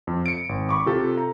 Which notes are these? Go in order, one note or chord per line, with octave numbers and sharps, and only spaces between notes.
F2
C#7 D7
G#1
B5 C#6 D6
C3 F4 G4 A4
A#5